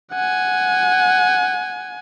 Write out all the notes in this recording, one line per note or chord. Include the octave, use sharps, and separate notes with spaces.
F#5 G#5